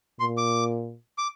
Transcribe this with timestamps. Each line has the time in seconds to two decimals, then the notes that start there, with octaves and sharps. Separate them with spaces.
0.20 A#2 C6
0.37 D6
1.18 D6